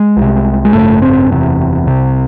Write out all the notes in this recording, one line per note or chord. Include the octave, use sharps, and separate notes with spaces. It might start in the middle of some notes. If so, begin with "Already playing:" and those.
Already playing: G#3
C2 C3
G#3
G#1 F#2 C#3 A3
C4
F#1 E2 C3
C2 C3